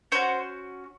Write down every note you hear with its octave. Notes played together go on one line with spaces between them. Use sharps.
C#4 F#4 C5